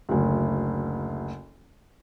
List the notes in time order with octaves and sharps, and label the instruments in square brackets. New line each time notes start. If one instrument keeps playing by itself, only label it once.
[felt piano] F#1 D2